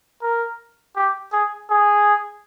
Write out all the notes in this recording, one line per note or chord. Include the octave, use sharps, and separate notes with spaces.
A#4
G4
G#4
G#4